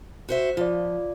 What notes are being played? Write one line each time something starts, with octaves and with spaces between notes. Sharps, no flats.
F#4 C5 E5
F3 F4 D5